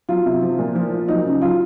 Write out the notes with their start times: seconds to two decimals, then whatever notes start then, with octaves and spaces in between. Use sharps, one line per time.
0.09 F#3 F4
0.26 C3
0.42 F3
0.59 A#2
0.75 F3
0.92 A#2
1.08 F#3 D#4
1.25 C#3
1.41 F#3 F4